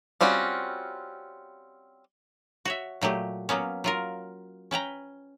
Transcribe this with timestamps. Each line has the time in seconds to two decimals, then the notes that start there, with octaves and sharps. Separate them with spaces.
0.21 G3 C4 C#4 F4 F#4
2.65 F#4 C#5 E5
3.01 A#2 F#3 A3 G4
3.49 F#3 A#3 B3 C#4
3.84 F#3 F4 A#4
4.71 C#4 B4 G5 A#5